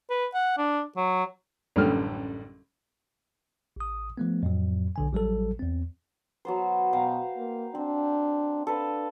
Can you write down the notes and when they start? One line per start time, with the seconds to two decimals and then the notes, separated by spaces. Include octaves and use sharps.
0.10 B4
0.34 F#5
0.58 D4
0.97 F#3
1.76 A1 F#2 D3 G3 A4 F6
3.76 A1 D#6
4.18 F3 A3 B3
4.43 F2 A2 F#3
4.96 B1 D3 G#5
5.13 A1 F#3 G3 A4
5.59 E2 C4
6.45 F#3 B3 C5
6.93 B2 F5 G5 A#5
7.37 A#3
7.75 C4 D4
8.67 D4 A4 B4 F5